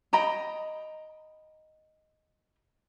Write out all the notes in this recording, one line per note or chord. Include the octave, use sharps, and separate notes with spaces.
D#5 G5 A#5 B5